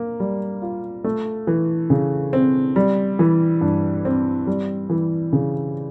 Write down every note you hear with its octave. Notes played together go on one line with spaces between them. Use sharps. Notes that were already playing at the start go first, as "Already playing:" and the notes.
Already playing: A#3
G3
F4
A3
E3
C#3
C4
G3
E3
G2
C4
G3
E3
C#3